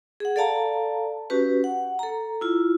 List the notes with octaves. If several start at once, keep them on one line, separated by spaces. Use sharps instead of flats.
G#4 F#5
A4 D5 F5 A5 A#5
C#4 F#4 G4 B4
F#5
A4 A#5
E4 F4